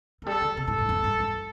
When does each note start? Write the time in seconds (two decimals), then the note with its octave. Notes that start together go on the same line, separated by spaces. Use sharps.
0.22 E3
0.26 G3 A4
0.42 D3
0.57 C3 A4
0.67 A2
0.78 G2
0.89 E2
1.04 G2
1.20 G2